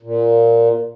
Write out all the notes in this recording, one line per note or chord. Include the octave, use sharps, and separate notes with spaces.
A#2